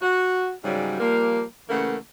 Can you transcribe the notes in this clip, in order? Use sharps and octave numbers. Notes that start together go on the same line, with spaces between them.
F#4
G#2 C#3 F#3 G3
F3 G3 A#3
C#3 E3 A3 A#3 F#5